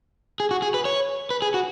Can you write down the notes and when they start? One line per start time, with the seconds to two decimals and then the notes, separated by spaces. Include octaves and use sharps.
0.40 G#4
0.51 F#4
0.62 G#4
0.74 B4
0.85 C#5
1.31 B4
1.42 G#4
1.54 F#4